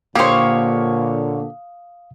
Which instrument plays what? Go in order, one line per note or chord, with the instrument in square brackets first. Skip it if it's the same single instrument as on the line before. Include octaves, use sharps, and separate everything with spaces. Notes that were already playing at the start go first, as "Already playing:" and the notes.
[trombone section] A#2 D3 [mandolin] A#3 C#5 [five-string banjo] G4 C5 [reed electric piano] F5 D#6